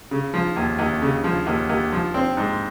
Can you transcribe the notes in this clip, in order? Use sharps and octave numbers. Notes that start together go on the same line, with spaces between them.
C#3
F3
D#2
D#2
C#3
F3
D#2
D#2
F3
C4
G#2